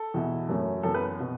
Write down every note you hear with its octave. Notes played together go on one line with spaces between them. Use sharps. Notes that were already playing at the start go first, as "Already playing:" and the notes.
Already playing: A4
E2 B2 B3 E4
F#2 F#3 A3 C#4
F#2 E3 B3 A4
B4
B2 B3